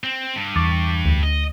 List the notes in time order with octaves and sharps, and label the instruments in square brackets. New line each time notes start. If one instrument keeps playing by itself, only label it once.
[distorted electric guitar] C4
G2
[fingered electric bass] E2 [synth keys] C#6 D6 A6
[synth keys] D2
[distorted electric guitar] D#5